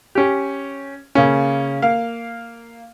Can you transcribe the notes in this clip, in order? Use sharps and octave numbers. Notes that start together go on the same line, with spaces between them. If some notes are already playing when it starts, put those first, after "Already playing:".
C#4 G4
C#3 A#3 C#4
A#3 F5